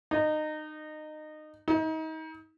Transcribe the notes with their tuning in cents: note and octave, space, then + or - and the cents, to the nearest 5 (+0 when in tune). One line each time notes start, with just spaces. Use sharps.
D#4 -25
D#4 +30